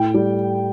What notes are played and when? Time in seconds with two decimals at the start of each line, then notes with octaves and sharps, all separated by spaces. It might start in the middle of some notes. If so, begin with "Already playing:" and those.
Already playing: A2 G5
0.14 G3